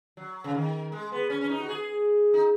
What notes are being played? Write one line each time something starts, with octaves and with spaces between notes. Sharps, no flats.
F#3
C#3
D#3
G#3
B3
C#4
C#4
D#4
F#4
G#4
D#4